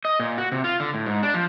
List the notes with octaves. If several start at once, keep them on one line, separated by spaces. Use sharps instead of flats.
D#5
A#2
F#4
C3
F4
D3
A2
G#2
D4
F3